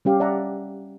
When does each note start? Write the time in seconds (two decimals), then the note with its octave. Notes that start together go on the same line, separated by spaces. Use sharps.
0.05 G3 C#4 G4 F5
0.20 D5 E5 F#5 A5 A#5